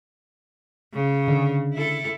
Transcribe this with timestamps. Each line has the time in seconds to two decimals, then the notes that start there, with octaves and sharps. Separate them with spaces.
0.94 C#3
1.28 D3
1.74 E4 A4